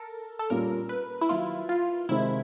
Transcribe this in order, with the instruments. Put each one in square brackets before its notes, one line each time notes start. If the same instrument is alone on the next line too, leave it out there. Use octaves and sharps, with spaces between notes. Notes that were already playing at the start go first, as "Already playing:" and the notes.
Already playing: [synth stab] A4 A#4
A4
[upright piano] A#2 G3 A#3 C#4 F4 [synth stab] A#4
[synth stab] B4
E4
[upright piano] D#3 F#3 A#3 [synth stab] F4
[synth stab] F4
[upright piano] C3 D#3 G#3 C4 D#4 [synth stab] E4